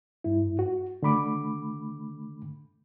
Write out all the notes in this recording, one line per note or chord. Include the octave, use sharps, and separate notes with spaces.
G2 E4
F#4
D3 A3 B5 D6